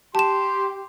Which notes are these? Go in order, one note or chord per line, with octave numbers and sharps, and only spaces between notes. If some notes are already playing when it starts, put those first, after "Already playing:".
G4 A5 C6 E7